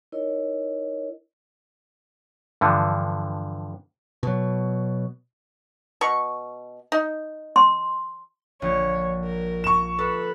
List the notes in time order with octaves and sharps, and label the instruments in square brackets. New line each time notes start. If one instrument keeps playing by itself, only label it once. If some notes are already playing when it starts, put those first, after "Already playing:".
[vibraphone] D#4 E4 A#4 C#5 D#5
[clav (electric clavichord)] G2 D3 E3 F3
[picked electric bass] B2 F#3
[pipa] B2 C#6
D#4
[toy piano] C6
[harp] A#1 [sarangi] C#5
[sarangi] A#4
[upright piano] C#6 E7
[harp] A4 [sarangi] B4